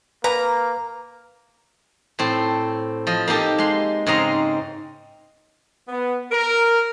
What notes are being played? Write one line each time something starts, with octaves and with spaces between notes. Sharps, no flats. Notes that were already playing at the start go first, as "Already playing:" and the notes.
A#3 B4 A#5
A2 C4 A4
F3 D#5
A#3 D#4 G4 A4
G#3 C6
G#2 C#3 C4 D#5 A#5
B3
A#4